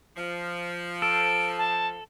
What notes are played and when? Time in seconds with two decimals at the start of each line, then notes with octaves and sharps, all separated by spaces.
0.17 F3
1.02 A4 D7
1.58 A5